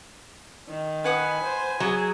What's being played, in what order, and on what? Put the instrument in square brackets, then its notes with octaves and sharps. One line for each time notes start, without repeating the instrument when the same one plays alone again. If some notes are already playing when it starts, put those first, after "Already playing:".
[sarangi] D#3
[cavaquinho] B4 F#5 D#6 [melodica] G#5
[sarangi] C5
[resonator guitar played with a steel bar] F#3 [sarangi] G#4